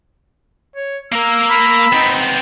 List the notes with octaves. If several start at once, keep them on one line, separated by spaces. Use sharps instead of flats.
C#5
A#3 A#4 E6
B5
B3 C4 D#4